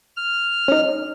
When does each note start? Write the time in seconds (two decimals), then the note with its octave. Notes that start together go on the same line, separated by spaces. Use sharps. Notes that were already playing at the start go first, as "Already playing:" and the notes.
0.16 F6
0.68 C#4 D#4